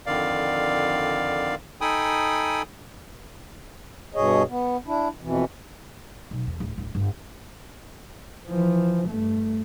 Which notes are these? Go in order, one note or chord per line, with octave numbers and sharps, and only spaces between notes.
F2 D3 D#3 D5 F5
D#4 A4 G5 G#5 B5 D#6
G2 B2 G#4 C#5 D#5
B3
D4 E4
F2 B2 E3
B1
E2
D1
D1
G1
E3 F3
G2 A3